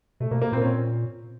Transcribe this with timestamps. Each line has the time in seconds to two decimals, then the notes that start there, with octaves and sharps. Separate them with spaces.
0.20 B2 A3
0.31 B2 A#3
0.42 A#3
0.52 A#2 C4
0.62 C#4